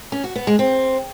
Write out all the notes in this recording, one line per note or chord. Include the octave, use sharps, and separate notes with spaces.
C#4
F#4
B3
G#3
C4